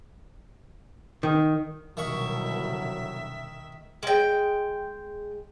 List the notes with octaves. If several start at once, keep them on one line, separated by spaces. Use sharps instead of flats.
D#3
C2 B2 D3 D#3 F#3 E5 C#6
G#3 G5